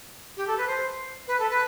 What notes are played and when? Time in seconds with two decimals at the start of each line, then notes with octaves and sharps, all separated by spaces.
0.37 G4
0.47 A4
0.58 B4
0.67 C5
1.28 B4
1.40 A4
1.50 B4